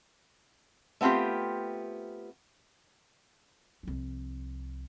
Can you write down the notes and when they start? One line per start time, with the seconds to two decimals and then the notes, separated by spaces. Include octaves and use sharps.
1.01 A3 B3 C4 F4 G4
3.83 C2 F3